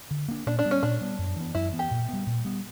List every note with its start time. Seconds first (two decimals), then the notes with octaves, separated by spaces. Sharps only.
0.11 D3
0.28 A#3 D4
0.46 A#2 D4
0.59 D4
0.64 G3 B3
0.71 C#4
0.82 A#2 D4
1.01 G3 B3
1.18 F#2
1.36 E3 B3
1.54 F#2 E4
1.72 E3 B3
1.79 G4
1.91 A#2
2.09 G3 B3
2.27 A#2
2.45 G3 B3